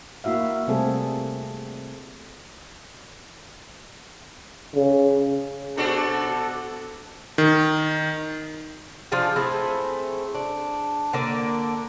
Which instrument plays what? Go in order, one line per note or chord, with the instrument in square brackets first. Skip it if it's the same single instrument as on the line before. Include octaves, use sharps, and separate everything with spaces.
[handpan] A#3 E4 F#4 E5 F5
C3 G3 A3 C4 G#4 A4
[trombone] C#3
[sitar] B2 D4 F#4 [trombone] A4
[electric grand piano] D#3
[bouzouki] F3 D4 F4 G#4
A3 C4 E4 G#4
D4
D3 A#3 D4 D5